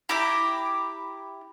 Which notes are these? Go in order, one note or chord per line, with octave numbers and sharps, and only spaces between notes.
E4 G4 A#5 D6